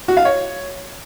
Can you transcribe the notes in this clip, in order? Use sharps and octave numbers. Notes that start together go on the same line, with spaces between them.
F#4
F5
C#5